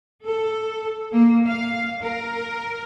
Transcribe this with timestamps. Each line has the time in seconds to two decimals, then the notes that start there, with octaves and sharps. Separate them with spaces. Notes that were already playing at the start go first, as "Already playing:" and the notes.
0.24 A4
1.11 A#3
1.48 F5
2.03 A#4